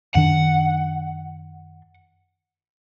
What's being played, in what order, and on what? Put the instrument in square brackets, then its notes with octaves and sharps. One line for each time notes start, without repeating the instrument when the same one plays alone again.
[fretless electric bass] F#2 D#3 D4 [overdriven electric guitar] F#5